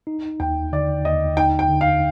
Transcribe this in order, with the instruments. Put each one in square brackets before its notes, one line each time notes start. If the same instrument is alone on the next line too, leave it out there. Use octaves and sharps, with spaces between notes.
[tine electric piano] D#4
[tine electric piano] D#2 [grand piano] G5
[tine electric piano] D3 [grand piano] D5
[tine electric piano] D#2 [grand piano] D#5
[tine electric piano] D#4 [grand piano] G5
[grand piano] G5
[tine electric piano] D3
[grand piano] F5